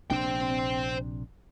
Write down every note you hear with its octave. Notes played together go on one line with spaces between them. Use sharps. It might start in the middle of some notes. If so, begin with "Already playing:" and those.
A#1 C3 D4 C5 G5